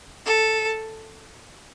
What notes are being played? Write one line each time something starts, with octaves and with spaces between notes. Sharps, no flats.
A4